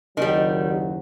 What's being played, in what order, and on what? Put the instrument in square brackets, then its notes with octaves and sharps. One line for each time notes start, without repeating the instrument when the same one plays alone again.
[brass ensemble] F#1 D#2 F#3 [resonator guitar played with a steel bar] D#3 G3